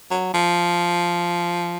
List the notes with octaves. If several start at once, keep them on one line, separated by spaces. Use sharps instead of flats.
F#3
F3